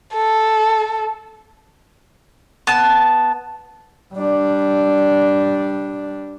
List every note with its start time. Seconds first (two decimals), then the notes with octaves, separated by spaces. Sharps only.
0.15 A4
2.67 B3 A5
4.14 G3 D4